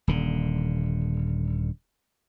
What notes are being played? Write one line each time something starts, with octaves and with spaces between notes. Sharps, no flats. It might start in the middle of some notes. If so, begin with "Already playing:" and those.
D#1 D3